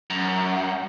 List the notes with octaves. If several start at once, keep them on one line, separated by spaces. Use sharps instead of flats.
F#2